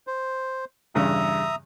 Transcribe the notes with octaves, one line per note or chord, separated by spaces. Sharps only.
C5
E2 G2 C#3 E5 A#5 D#6